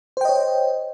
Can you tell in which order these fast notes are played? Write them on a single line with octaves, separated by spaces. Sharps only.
C5 G5 D#5 C#5